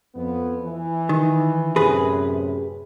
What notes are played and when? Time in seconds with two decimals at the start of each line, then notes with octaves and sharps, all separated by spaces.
0.16 F2 B3
0.65 E3
1.09 D#3
1.76 F#2 A2 C3 G#4 B4